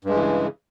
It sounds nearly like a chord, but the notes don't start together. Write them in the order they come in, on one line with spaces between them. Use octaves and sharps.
G2 G#3 E3 C#3